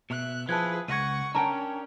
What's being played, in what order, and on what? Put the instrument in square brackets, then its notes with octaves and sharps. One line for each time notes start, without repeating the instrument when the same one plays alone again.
[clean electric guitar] B2 [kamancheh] E5 F#6
[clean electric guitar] F3 E4 [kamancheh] G#4 B4 [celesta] A5 F#6 G#6
[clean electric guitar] C#2 [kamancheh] F#5 C#6 [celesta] G#6 A#6 D#7
[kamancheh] C#4 [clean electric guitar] D4 A#4 G5 [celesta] A5 A#5